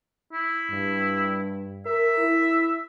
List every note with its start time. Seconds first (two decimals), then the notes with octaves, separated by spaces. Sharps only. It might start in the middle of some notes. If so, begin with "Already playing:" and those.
0.32 E4
0.71 G2
1.86 A#4 E5
2.18 E4